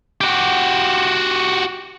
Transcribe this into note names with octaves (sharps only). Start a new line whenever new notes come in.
F#4 G4